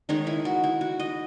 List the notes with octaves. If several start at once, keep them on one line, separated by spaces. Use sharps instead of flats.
D#3 G#3 C#4 D#4
E4
F#4
E4
F#4
D#5